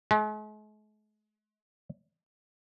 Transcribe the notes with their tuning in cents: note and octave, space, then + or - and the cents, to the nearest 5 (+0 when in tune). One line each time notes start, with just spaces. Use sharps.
G#3 +45